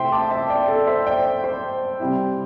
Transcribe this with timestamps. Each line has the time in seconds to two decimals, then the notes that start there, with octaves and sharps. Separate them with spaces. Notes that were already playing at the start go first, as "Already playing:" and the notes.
Already playing: C3 A3 C4 E4 C5 E5 G5 C6
0.12 A5 D6
0.30 E5 A5
0.50 D5 G5
0.68 A4 D5
0.87 C5 E5
1.06 D5 G5
1.44 C5
2.00 C3 G3 C4 E4